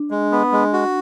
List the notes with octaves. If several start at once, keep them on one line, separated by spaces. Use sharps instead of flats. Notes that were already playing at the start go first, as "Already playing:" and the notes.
Already playing: D4
G#3
B3
G#3
F#4